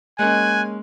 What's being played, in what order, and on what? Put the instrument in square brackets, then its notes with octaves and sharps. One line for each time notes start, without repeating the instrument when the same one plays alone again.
[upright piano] G#3 A#3 C#4 [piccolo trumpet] G#5 [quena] F#6